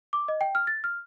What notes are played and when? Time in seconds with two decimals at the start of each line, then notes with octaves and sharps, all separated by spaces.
0.13 D6
0.28 D#5
0.41 G5
0.55 F6
0.67 A6
0.84 F6